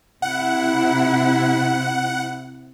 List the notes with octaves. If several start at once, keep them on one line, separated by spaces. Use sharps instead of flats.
C3 E4 F#5